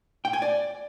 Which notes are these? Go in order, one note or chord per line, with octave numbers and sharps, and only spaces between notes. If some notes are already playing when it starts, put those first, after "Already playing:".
G5
G#5
D5